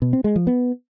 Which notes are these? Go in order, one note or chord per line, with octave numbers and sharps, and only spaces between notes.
B2
C4
G#3
F3
B3